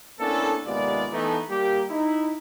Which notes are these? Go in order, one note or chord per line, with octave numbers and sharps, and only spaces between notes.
A#3 B3 C#4 D4 E4 A4
D#2 C3 G#3 B3 F4 D5
E3 A3 B3 D#4
G3 A#3 G4
D#4 E4